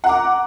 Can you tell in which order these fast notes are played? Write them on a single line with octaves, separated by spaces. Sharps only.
F#5 A#5 D6